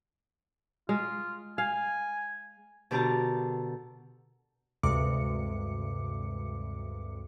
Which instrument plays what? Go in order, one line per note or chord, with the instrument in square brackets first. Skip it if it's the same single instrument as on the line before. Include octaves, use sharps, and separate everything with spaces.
[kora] G#3 [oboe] F4
[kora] F5 [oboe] G#5
[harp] B2 D3 G4 A#4 A5 A#5
[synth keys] D2 G2 C3 G#3 D6 C#7